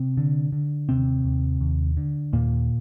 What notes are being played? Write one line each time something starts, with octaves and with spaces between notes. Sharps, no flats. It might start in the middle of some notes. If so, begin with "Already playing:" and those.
Already playing: C3 C4
D3
D3
D#2 C3 C4
D#2
D#2
D3
D#2 A#2 A#3